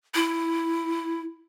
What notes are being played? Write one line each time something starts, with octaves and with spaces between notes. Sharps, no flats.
E4